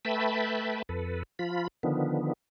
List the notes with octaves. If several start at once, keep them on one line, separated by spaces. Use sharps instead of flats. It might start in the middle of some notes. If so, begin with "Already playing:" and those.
A3 B4 E5 G5 A5 B5
F2 A4 B4
F3 F4 B5
D3 D#3 F3 B3